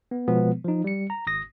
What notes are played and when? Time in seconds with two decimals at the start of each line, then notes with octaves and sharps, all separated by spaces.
0.11 B3
0.28 B2 F3 G#3 B3
0.64 F3 D#4
0.84 G3 C#7
1.10 A#5
1.27 G#1 D#6 A#6